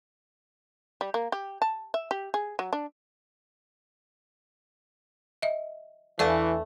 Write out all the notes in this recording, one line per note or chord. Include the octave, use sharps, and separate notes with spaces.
G3
A#3
G4
A5
E5
G4
G#4
F#3
D4
D#5 E5
E2 E3 A3 D5 A5